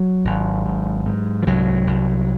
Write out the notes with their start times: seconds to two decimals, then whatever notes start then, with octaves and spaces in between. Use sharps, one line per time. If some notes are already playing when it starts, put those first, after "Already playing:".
Already playing: F#3
0.25 G#1
0.66 G#2
1.06 G#2
1.43 F3
1.46 C2 F#3
1.87 C2